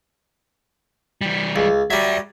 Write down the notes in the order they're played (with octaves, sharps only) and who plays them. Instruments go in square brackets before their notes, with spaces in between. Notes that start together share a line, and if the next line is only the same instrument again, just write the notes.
[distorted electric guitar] E3 G3
[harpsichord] C#2
[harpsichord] F#3 G3 [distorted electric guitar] D5 E5